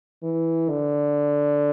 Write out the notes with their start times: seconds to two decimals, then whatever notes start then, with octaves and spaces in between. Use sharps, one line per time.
0.23 E3
0.69 D3